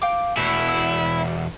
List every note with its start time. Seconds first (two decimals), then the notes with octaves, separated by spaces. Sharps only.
0.02 F5 G5 D6
0.37 E2 B2 A3 E4
0.68 E6